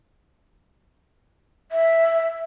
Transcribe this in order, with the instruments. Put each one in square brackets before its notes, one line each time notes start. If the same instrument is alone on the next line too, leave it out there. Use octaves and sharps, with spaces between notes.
[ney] E5